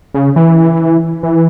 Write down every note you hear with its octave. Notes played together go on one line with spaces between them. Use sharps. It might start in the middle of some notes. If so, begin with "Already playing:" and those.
C#3
E3
E3